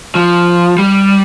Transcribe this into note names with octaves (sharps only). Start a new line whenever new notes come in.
F3
G3